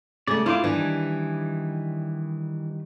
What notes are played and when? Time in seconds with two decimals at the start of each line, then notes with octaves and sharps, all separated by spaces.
0.27 C#3 A3 D5
0.46 C#4 E4 F4 C5 D6
0.64 D#3 E3 G3 D4 G#5